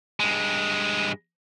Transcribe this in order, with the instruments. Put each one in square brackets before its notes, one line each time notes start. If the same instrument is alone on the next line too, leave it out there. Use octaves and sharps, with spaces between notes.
[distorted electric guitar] G2 G#3